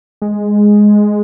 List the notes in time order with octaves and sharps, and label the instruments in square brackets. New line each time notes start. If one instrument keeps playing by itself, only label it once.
[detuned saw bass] G#3